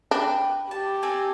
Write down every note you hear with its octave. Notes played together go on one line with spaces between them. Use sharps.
D4 B4 G5
G4 A5
C4 A4 G#5